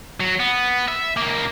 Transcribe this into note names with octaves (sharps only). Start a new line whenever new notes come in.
F#3
B3
E5
C#2 A#3